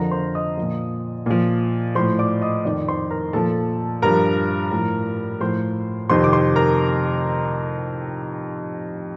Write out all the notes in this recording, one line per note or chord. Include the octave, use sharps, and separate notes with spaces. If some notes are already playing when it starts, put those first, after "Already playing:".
Already playing: F2 D3 F3 A#4 A#5
C5 C6
D#5 D#6
A#2 F3
A#2 F3
A2 F3 C5 C6
D5 D6
D#5 D#6
F2 D#3 D5 D6
C5 C6
A#4 A#5
A#2 F3 A4 A5
G2 F3 A#4 A#5
A2 F3
A2 F3 C5 C6
F2 C3 D#3 C5 C6
D6
C5 C6
A#4 A#5